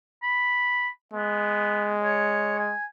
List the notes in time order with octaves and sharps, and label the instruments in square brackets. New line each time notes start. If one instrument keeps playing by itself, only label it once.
[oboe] B5
[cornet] G#3 [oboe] B3
[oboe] C#5
G#5